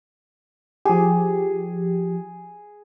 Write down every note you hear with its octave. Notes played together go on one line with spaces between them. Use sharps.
F3 G4 G#4